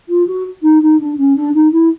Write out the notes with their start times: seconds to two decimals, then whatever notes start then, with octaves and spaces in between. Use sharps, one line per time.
0.09 F4
0.27 F#4
0.62 D#4
0.82 D#4
1.00 D4
1.17 C#4
1.36 D4
1.54 D#4
1.72 E4